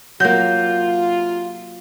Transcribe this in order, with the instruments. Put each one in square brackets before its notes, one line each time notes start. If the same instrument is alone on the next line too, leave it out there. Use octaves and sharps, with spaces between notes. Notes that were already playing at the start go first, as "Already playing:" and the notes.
[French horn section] C3 F4 [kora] F#3 A#3 [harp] G6